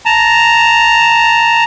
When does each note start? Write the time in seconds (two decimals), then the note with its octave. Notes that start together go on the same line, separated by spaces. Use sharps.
0.06 A5 A#5